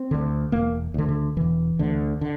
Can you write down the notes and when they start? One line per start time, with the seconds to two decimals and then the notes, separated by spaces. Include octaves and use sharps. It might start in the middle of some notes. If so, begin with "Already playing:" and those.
Already playing: C4
0.11 D2 D3
0.52 E1 A#3
0.94 D2 D3
1.09 D3
1.36 E1 E3
1.79 D2 D3
2.21 D3